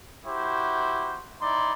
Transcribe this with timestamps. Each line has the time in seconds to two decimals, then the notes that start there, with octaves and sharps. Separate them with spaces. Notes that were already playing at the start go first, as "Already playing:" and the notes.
0.24 E4 F#4 G4 C5
1.41 D#4 E4 D5 C6